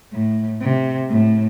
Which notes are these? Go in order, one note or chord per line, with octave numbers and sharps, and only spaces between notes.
A2
C3
A2